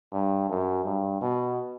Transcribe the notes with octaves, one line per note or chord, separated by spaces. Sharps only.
G2
F#2
G2
B2